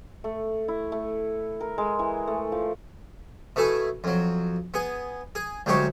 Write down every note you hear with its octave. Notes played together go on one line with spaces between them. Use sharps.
A3
E4
A3
A#4
G#3
E3
A3
F3
B2 A3 E4 A4 G#5
F2 F#3
B3 G#4
G#4
D2 F#3 G#3 G4 C#5